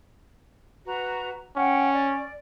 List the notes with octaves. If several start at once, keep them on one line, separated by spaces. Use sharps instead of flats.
F#4 B4 A#5
C#4 F#5 G5
D5